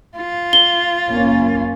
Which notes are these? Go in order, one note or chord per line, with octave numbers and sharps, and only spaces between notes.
F4
G7
F#1 A#3 C#4